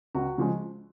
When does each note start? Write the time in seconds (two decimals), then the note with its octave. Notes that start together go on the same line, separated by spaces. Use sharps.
0.15 C#2 F#4
0.38 C#3 F3 G#3